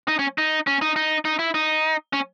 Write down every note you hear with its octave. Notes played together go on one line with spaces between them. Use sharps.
D#4
C#4
D#4
C#4
D#4
D#4
D#4
E4
D#4
C#4